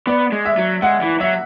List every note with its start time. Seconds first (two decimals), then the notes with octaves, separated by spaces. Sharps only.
0.07 B3 D5
0.32 G#3
0.45 E5
0.58 F#3
0.82 G#3 F#5
1.02 E3
1.20 F#3 E5